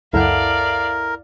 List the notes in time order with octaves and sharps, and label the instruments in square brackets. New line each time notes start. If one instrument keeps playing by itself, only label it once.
[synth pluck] C#2 F#2 F#5 [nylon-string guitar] E4 A4 [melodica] A#4 [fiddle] D5 F5